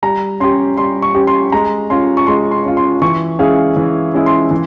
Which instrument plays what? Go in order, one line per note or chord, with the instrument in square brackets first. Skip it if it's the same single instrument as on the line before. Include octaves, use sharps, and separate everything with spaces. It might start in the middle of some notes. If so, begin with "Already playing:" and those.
[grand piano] G3 [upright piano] A#5
[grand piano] C#4 G4 [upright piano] C6
[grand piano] G3 [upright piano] C6
[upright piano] C#6
[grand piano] C#4 G4
[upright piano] C6
[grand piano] G#3 [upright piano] A#5
[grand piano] C#4 F4 [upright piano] C6
[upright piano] C#6
[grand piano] G#3 [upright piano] C6
[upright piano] C6
[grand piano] C#4 F4
[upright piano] C6
[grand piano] E3 [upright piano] C#6
[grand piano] G#3 C#4 E4 G#4 [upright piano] F5
[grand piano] E3
G#3 C#4 E4 G#4
[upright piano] C6
[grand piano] E3